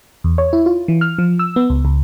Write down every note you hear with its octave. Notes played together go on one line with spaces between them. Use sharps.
E2
C#5
E4
F4
E3
F6
F3
E6
B3
C#2
C#2